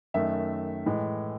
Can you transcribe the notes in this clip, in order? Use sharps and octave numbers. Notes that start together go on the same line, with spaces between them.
F#2 D#3 A3 E5
A2 E3 G#3